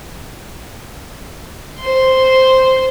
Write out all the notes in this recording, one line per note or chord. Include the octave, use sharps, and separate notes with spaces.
C5 C6